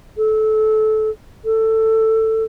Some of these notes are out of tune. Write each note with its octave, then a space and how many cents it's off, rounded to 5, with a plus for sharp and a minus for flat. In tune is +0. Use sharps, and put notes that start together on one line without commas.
A4 -20
A4 +15